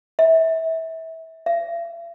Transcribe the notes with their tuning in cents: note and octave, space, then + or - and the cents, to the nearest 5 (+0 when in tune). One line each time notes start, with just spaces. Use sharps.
E5 -25
E5 +45